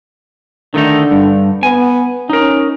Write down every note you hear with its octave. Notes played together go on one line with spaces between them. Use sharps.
D3 D#3 A3 D#4
G2
B3 G#5
C#4 D#4 A#4